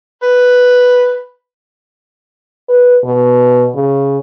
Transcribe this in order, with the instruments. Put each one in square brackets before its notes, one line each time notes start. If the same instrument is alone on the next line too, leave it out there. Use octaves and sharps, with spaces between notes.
[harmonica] B4
[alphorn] B4
B2
C#3